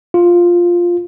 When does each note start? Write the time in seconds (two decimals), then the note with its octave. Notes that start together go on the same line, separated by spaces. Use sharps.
0.14 F4